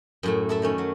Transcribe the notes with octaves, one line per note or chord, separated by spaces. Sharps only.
F#2 A2 A3
E4 A4 E5
D#3 A3 C#4
F#3